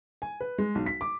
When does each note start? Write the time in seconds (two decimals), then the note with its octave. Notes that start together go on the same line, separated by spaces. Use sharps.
0.22 G#5
0.41 B4
0.58 G#3
0.75 B1
0.86 B6
1.01 D6